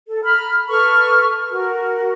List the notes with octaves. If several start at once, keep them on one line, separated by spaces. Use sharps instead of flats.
A4
A#5 B5 F6
A4 B4 C#6 F6
F#4 A#4